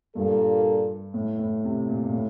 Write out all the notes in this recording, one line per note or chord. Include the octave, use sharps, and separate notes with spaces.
G2 A#2 G3 A#3 D4 A4
A2
A2
C3
A#2
A#2
A2